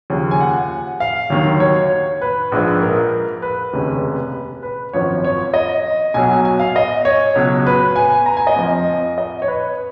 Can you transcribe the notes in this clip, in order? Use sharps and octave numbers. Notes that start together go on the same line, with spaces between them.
D#2 C#3 F3
G#5
F#5
F5
D#2 D#3 F#3
C#5
B4
A#1 G#2 F3
A#4
B4
F1 D#2 C#3
B4
G#1 F#2 F3 C#5
C#5
D#5
B1 B2 F#3 G#5
G#5
F5
D#5
C#5
C#2 B2 F#3
B4
G#5
A#5
G#5
D#5
F2 F3
D#5
C#5
B4